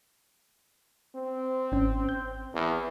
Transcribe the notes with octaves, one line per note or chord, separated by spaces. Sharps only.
C4
G#1 C#4
G6
E2